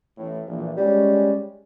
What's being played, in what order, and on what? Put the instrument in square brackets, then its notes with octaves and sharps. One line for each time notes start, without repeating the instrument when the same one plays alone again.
[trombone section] A1 A2
A#1 E3
[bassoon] G3 [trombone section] G#3 C#4